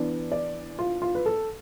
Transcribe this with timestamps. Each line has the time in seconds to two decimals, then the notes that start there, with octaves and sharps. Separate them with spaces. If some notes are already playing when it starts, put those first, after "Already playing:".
Already playing: E3 B3 D4 D5
0.32 D5
0.79 F4
1.02 F4
1.15 B4
1.26 A4